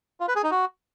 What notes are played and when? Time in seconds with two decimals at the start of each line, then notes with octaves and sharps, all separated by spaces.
0.20 F4
0.28 B4
0.36 G#4
0.43 D#4
0.51 F#4